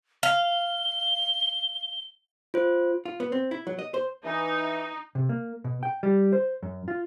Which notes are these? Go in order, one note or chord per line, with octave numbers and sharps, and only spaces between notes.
F5 G7
F4 C5
F4
B3
C4
E4
F#3
D#5
C5
E3 D#4
C3
A#3
B2
G5
G3
C5
F#2
F4